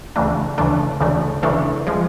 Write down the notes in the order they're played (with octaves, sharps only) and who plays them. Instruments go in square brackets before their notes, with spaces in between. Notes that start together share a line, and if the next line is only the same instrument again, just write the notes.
[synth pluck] D2 C#3 E3 A3 D4
D2 C#3 E3 A3 D4
D2 C#3 E3 A3 D4
D2 C#3 E3 A3 D4
F3 G#3